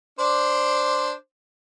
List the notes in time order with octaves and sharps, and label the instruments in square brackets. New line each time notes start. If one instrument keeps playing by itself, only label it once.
[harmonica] D4 C5 D5